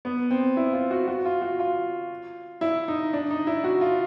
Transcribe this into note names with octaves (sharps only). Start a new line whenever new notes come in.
B3
C4
E4
F4
F#4
F#4
F4
F#4
F4
E4
D#4
D4
D#4
E4
F#4
F4